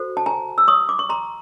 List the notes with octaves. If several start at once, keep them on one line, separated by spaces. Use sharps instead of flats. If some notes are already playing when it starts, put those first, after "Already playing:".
Already playing: F#4 A4 C5
A5
G#5 A#5
E6
C#6 D#6
D6
C#6
A#5 C6